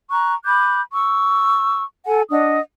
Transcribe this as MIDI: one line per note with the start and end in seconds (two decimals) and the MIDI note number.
0.10 0.34 82
0.10 0.34 85
0.10 0.34 90
0.44 0.81 83
0.44 0.81 86
0.44 0.81 90
0.44 0.81 91
0.94 1.82 85
0.94 1.82 88
2.05 2.22 69
2.05 2.22 78
2.05 2.22 80
2.31 2.59 62
2.31 2.59 75
2.31 2.59 78
2.31 2.59 87